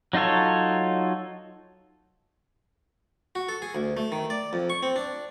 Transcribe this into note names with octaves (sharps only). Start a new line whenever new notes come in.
F#3 D#4 F4 A4 C#5
F#4
A4
G#4
D2
A3
D#3
D5
F2
C#6
C4
D4